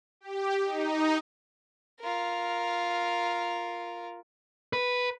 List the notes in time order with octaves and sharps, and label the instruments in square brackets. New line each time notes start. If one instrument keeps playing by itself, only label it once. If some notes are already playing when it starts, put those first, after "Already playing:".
[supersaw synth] G4
D#4
[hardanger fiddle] F4 A#4
[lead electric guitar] B4